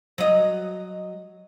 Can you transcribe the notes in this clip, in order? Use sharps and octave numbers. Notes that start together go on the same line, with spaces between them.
F#3 D#5